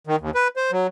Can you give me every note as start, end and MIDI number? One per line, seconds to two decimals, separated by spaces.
0.07 0.16 51
0.20 0.30 39
0.35 0.48 71
0.56 0.71 72
0.72 0.87 54